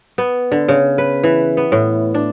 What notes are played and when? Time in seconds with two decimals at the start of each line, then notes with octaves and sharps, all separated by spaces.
0.18 B3
0.52 D3
0.68 C#3
0.98 B4
1.23 E3
1.57 B3
1.72 A2
2.14 D4